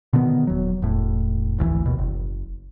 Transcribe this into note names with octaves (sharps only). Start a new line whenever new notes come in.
B2 D3 D#3 B3
D#1 F#3
E1 A2
G#1 D2 D#3 E3
D#2 B2
F#1